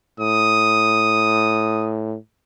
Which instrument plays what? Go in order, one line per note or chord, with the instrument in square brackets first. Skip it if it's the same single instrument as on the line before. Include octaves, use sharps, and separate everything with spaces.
[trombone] A2 [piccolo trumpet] D#6